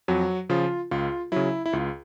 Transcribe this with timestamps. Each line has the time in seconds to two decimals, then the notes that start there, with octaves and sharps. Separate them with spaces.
0.08 F2 F#3 F#4
0.49 C#3 F3 F4
0.91 C#2 F4
1.32 C#3 F#3 E4
1.66 E4
1.73 C#2 F4